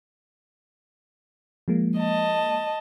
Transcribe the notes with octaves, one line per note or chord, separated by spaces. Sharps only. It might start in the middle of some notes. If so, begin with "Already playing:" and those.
F3 G#3 A#3
D#5 A5